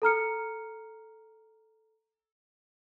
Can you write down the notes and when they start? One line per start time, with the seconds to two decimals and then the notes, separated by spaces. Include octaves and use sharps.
0.02 A4 A#5 F6 C#7